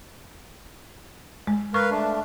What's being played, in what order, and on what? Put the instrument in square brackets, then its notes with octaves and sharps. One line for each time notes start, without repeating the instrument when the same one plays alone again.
[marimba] G#3
[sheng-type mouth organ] A#4 B4 F5 [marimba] C#6
[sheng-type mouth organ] A3 D4